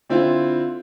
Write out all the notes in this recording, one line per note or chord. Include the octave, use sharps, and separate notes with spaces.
D3 C4 E4 F4